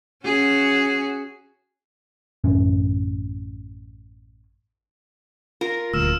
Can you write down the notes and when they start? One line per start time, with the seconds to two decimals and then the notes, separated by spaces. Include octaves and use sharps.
0.25 C#4 F#4 G#4
2.44 A1 F#2 C#3 C#4
5.61 F4 A#4
5.94 D#1 D2 E6 F6 E7